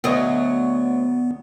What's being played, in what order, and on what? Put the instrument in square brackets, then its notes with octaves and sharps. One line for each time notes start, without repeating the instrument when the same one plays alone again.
[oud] D2 F#3 D#5 [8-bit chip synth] B3